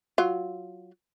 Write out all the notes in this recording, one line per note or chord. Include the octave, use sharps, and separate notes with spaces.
F#3 F4